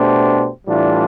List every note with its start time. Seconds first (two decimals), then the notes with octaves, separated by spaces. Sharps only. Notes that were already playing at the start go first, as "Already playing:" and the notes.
Already playing: B2 A3 D4 G4 C5
0.67 A2 E3 G3 D4 F4